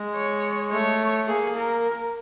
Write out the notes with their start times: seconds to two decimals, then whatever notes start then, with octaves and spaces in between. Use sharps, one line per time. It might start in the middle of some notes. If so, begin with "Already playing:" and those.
Already playing: G#3
0.16 C#5
0.72 A3 C#5
1.28 A#3 G#4
1.56 A#4